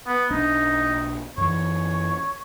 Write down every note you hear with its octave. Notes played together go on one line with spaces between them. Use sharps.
B3
B1 D4 D#4
F#2 E3 C#5